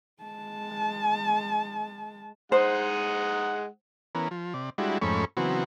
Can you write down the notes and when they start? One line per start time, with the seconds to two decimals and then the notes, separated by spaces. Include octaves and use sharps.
0.23 G#3 A5
2.52 G#3 D#4 C5 F#5
4.15 E3 B3 C#4 A#4
4.31 F3
4.54 C3 D5
4.78 G3 G#3 D4 E4 F#4
5.02 F2 G#2 A3 C#4 B5 C#6
5.37 C#3 E3 F#3 B3 C4 F#4